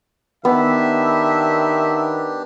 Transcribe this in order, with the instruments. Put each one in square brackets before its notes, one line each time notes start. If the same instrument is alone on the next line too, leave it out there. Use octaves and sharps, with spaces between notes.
[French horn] D#3 [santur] B3 [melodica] D4 G4 [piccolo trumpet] E5